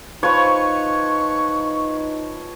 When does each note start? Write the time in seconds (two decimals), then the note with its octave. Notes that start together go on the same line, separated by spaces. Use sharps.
0.23 F3 D#4 B4 C#5 C#6